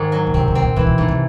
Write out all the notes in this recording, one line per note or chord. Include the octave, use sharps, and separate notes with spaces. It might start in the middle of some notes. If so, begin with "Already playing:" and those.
Already playing: G#2 D#3
F#3
B2
C3 C4
C3
C4
A#2
A#2 E3
B2
G#2 B2
C3